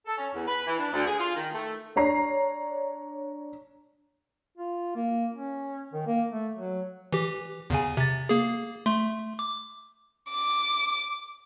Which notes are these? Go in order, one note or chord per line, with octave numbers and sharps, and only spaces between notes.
A4
C#4
E2
B4
E3
D4
D2
G#4
F4
D#3
A3
D4 C#5 A#5 C7
F4
A#3
C#4
D#3
A#3
A3
F#3
E3 G4
E2 C#3 G#5
C3 A6
A#3 G#4
A3 C6
D6
D6